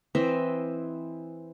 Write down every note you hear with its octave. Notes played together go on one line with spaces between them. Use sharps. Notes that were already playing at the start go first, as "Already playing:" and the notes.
E3 C4 D#5 E5